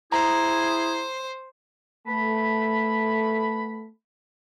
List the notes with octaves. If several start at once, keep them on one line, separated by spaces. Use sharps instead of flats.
E4 G#4 C5 A#5
A3 B3 A5 B5